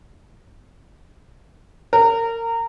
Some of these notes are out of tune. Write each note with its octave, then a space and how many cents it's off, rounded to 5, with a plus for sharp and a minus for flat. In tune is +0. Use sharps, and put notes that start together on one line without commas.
A#4 -25